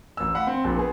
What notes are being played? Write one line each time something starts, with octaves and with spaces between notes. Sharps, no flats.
A1 E6
F5 F#5 B5
C4
A#1
B3 G#4